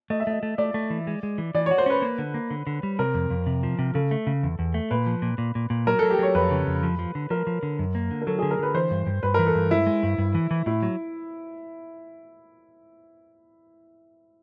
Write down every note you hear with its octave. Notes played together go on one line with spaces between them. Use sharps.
A3 D#5
E5
A3 D#5
A3
A3 D5
A3
E3
G#3
G#3
E3
E3 D5
F#4 C#5
C5
C#4 B4
A#3
D3
A#3
D3
D3
G3
C3 A#4
F2
F2
C3
F3
C3
C#3 A4
A3
C#3
E2
E2
A3
A#2 B4
F3
A#2
A#2
A#2
A#2
F#3 A#4
F#3 A4
G4
F#3 C#5
F2 B4
C#3
F2
F3
F3
D3
F3 A#4
F3
D3
F#2
A#3
D3
A#4
F#3 A4
D3 G#4
A#4
D3 B4
E3 C5
G2
G2
G2 B4
E3 A#4
A4
G2
G#3 E4
G#3
G2
G2
E3
E3
A2 E4
F#3